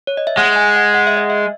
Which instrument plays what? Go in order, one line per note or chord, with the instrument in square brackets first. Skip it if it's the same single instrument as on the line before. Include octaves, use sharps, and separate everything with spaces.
[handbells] C#5
D#5
E5
[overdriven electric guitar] G#3 [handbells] F#5
[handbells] G#5
F#5
F#5
E5
D#5
E5